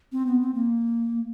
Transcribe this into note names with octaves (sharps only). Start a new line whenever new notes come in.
C4
B3
C4
A#3